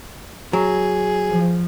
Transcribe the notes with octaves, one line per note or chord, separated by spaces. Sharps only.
F#3 G#4
F3